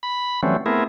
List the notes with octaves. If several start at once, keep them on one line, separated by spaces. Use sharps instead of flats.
B5
E3 F#3 G3 A3 C4 C#4
A3 B3 C4 E4 G#4 A#4